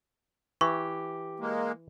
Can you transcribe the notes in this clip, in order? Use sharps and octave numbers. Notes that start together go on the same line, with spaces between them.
E3 G4 C#6
G#3 A#3